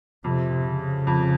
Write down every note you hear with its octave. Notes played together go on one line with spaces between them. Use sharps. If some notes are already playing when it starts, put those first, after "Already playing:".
F2 C3
C#3
F2